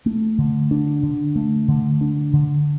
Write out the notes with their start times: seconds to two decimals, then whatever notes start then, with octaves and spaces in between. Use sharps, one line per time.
0.06 A3
0.39 D3
0.71 D4
1.03 D3
1.36 A3
1.69 D3
2.01 D4
2.34 D3